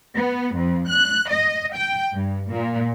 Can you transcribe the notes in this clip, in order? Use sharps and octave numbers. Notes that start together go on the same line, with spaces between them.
B3
F2
F#6
D#5
G5
G2
A#2